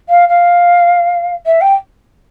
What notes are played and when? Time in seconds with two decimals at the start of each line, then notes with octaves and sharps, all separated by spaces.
0.08 F5
0.28 F5
1.45 E5
1.61 G5